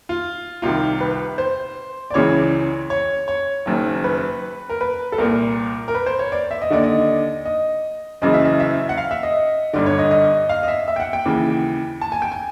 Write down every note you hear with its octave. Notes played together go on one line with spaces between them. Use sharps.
F4
C2 C3 D#3 F4
B4
C5
D5
C#2 C#3 E3 C#5
C#5
C#5
F#1 F#2 D#3
B4
A#4
B4
A4
C2 A#2 A#4
A#4
B4
C5
C#5
D5
E5
D#5
D#2 D3 D5
D#5
D#5
F#1 F#2 C#3 E3 D#5
E5
D#5
E5
F#5
F5
E5
D#5
G1 G2 D3 D5
C#5
D#5
D#5
F5
D#5
E5
E5
G5
F#5
G5
D#2 C#3 E3
A5
G#5
G5
G#5